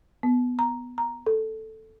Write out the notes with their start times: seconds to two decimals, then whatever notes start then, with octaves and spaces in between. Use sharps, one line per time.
0.23 B3
0.59 A#5
0.98 A#5
1.27 A4